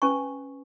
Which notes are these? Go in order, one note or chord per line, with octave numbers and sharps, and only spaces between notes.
C#4 B4 G#5 C#6